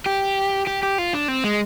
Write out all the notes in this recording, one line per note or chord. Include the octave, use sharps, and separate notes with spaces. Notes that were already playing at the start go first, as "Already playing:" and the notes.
G4
G4
G4
F4
D4
C4
G#3